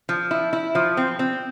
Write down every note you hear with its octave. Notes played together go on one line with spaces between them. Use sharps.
F3
E4
E4
F3
C4
C4